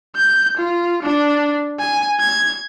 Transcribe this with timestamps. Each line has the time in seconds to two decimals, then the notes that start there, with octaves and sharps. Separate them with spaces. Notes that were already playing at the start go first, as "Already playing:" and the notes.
0.17 G6
0.58 F4
1.03 D4
1.80 G#5
2.20 G#6